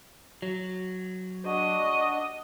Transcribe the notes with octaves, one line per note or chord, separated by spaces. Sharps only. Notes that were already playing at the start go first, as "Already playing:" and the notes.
F#3
D4 F#4 D#5